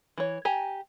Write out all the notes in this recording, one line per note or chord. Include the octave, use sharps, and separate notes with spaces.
E3 C#5
G4 G#5 A#5